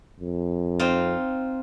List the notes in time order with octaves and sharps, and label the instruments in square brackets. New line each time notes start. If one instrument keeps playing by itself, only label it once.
[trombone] F2
[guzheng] C4 D#4 F4